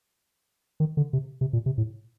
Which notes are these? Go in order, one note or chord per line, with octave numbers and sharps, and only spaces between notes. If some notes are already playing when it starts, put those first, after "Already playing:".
D#3
D3
C3
C3
A#2
C3
A2